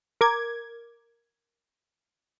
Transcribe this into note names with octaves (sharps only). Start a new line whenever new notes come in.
A#4 D6 G#6